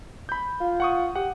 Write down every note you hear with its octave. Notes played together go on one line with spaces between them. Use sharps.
B5 G6
F4
F#5 C#6 D#6
G4 F#5